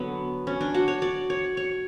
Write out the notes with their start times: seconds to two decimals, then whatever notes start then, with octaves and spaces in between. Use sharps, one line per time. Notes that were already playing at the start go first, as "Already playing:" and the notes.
Already playing: D3 F#3 B3
0.47 C#4
0.61 D4
0.74 F#4
0.88 C#5
1.02 D5
1.30 C#5
1.57 C#5